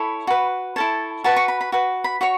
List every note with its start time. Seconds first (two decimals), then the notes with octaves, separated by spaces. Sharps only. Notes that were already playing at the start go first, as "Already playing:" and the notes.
Already playing: E4 A4 C#5 B5
0.27 F#4 B4
0.76 E4 A4 C#5 A5
1.24 F#4 B4 A5
1.36 C#6
1.48 B5
1.61 B5
1.72 F#4 B4
2.04 B5
2.21 F#4 C#5 C#6